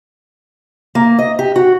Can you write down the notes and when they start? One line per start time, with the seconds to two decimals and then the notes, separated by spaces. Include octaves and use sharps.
0.95 A#3
1.19 D#5
1.39 G4
1.56 F#4